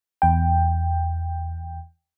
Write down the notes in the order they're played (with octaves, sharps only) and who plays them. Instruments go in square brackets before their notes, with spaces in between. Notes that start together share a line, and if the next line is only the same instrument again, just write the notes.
[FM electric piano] E2 G5